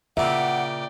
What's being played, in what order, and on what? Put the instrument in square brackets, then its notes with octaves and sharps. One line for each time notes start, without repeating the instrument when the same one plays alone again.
[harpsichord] A#2 C#3 [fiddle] D5 G5 [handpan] E5 [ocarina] F#5